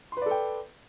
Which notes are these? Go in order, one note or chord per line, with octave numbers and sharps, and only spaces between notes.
A4 B4 D5 G5 C6